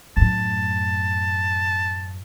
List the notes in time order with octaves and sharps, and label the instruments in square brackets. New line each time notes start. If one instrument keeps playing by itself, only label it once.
[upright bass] F#2 A2 [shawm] A5